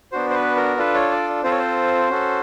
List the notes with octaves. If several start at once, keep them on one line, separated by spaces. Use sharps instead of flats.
B3 D4 F#4 C5
C5
B4
A#4
D4 F4 A4 B4
C#5
D5
C4 F4 A4 C5
C#5
C5
C#4 F#4 A4